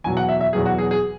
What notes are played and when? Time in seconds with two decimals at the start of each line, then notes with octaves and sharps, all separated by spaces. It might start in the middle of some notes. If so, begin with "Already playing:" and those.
0.04 E2 B2 F#3 G#5
0.17 F#5
0.29 E5
0.41 E5
0.53 E2 B2 F#3 G#4
0.66 F#4
0.78 G#4
0.91 G#4